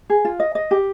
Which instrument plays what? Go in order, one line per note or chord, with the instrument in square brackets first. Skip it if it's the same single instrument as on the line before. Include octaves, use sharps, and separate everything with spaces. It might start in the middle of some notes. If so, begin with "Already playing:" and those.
[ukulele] G#4
F4
D#5
D#5
G4